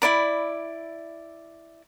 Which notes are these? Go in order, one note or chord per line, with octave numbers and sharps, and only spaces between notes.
E4 C5 D5 B5